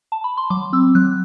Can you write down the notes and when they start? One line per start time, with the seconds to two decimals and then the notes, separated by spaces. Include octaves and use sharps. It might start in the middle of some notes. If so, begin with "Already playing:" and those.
0.12 A5
0.24 B5
0.38 C6
0.50 F#3 D6
0.73 C4 E6
0.95 F#3 F#6